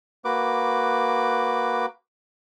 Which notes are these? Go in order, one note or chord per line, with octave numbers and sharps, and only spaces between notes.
A#3 F#4 B4 D6